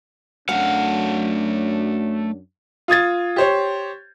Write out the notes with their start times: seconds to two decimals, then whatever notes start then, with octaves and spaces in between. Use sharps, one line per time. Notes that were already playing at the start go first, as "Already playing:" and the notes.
0.49 F#2 F#3 A3 D4 F5 F#5
2.88 F4 D#6 G#6 A6
3.36 G4 C5 C#5